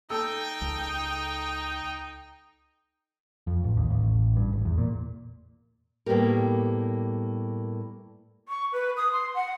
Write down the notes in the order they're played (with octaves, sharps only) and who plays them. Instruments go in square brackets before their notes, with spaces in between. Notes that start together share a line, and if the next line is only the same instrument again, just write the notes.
[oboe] D#4 [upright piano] A4 E6 [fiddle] G5
[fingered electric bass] C#2
[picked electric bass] F2
A1
D#2
A1
A1
G2
G#1
E2
A#2
[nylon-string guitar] A2 G3 A#3 B3 G4 A#4
[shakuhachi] C#6
B4
D#6
C6
F#5